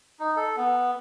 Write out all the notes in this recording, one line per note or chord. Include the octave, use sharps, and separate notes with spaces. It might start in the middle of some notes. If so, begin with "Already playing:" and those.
D#4
A4
B3